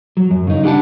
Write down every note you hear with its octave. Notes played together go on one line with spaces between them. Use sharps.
F#3
F#2
C#3 D#4
D4 G4 F#5 G#5 A5